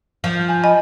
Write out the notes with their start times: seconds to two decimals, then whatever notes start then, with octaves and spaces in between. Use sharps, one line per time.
0.24 F3
0.49 G#5
0.64 D#5 G#5 B5